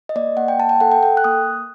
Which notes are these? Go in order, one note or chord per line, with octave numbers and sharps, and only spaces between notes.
D#5
A#3 D5
A#3 F#5
G5
A#3 A5
G5
A4 F#5
G5
A4 G5
F#6
A#3 D#6